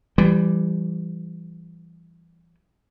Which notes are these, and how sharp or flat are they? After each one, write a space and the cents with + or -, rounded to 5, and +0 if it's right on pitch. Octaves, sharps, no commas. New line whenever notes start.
E3 +30 G3 +0